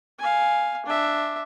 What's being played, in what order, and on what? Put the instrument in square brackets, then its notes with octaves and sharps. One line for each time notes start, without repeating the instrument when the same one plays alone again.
[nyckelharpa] F5 G#5
D4 E5